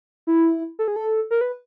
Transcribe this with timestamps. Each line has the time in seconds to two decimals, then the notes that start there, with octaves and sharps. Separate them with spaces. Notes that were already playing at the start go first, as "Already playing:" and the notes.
0.27 E4
0.79 A4
0.88 G#4
0.96 A4
1.31 A#4
1.41 B4